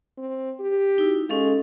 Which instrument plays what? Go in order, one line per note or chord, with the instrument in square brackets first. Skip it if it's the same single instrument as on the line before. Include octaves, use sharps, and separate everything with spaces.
[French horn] C4
G4
[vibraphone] D#4 E4 F#4
[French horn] G#3 [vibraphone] C#4 A4 F5